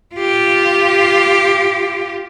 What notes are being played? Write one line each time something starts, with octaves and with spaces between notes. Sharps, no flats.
F4 G4